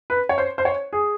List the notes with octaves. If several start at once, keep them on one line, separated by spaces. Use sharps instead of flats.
B4
C#5
C5
C5
C#5
G#4